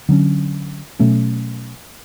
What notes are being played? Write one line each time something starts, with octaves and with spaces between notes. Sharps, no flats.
D3 F#3 C#4
B2 F#3 A3 C#4